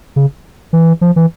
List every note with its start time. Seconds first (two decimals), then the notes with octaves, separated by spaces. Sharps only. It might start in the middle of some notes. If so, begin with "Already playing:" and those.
0.16 C#3
0.73 E3
1.01 F3
1.16 E3